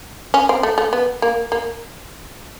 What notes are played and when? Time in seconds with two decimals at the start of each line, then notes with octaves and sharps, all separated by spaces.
0.34 C#4
0.49 C4
0.63 A3
0.78 A3
0.93 B3
1.22 A#3
1.52 A#3